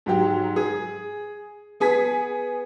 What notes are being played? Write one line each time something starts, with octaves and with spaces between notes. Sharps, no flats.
G#2 F#3 G4
G#4
B3 G#4 G#5 B6